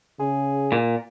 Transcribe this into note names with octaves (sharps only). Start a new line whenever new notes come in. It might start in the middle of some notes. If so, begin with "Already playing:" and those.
C#3 G#4
A#2